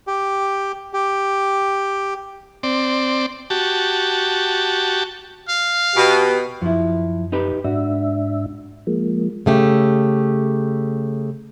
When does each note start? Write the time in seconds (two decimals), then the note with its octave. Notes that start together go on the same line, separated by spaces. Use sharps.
0.07 G4
0.93 G4
2.63 C4 D5
3.50 F#4 G4 A5
5.49 F5
5.96 B2 G4
6.62 F#2 F3 E4
7.32 D#4 G4 B4
7.64 G#2 D4 F#4 E5
8.87 F3 G#3 A#3
9.46 C#3 A3 G4